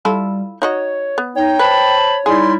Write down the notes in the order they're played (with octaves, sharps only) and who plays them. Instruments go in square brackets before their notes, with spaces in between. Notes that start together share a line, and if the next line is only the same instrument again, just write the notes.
[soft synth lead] G3 [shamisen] E4 F4 A4
[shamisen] D#4 F#4 D#5 [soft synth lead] C#5
[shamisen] B3
[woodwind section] D#4 [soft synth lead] C#5 [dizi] G5
[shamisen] B4 [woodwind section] C5 A5 B5
[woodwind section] G3 D#4 E4 [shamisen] G#4 [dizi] C6